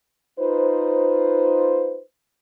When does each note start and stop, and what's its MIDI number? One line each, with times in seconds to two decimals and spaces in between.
0.39 2.01 63
0.39 2.01 65
0.39 2.01 71
0.39 2.01 72